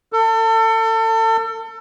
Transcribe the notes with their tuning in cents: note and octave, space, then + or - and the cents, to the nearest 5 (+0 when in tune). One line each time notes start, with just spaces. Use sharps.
A4 +30